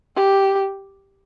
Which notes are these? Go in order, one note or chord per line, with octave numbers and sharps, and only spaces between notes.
G4